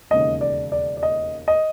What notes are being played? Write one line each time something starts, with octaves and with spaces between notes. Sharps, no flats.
E1 D#2 C#3 D#5
D5
D5
D5
D#5
D#5